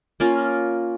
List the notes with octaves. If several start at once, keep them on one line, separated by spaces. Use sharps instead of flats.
A#3 C#4 F4 A#4